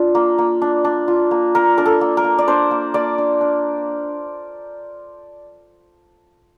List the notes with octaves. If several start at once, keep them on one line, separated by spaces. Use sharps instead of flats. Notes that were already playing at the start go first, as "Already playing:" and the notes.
Already playing: D4 F4
A#3
A#3
D4
D4
F4
A#3
A#3 A#4
D4 A#4
A4
A#3
A#4
A#3
D5
D4 C5
A#3
A#3 D5
D4
D4